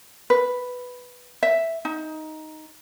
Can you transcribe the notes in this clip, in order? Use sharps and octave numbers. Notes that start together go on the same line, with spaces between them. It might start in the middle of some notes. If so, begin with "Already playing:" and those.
B4
E5
D#4